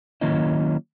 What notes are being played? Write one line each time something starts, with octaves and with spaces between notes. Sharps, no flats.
D#3 F#3 A#3 C#4 E4 D#5